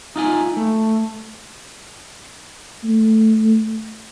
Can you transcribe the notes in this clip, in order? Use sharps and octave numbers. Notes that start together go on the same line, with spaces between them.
D#4 F4 G#5
A3
A3